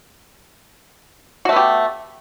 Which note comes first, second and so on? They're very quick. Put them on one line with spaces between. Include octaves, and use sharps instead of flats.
F#4 A3 B3 G4